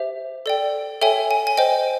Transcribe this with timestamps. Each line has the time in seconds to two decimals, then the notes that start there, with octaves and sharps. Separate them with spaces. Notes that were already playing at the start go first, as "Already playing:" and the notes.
Already playing: G4 C5 E5
0.46 A4 D5 G5
1.01 A4 C#5 E5 G5 G#5
1.31 G#5
1.47 G#5
1.57 C5 D#5 G5